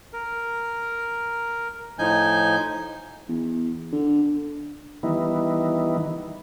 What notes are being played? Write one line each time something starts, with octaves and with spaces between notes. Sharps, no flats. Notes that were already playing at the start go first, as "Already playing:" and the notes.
A#4
A2 F3 D#4 G#5 G6
E2
D3
D#3 E3 G3 B3 D#4 E4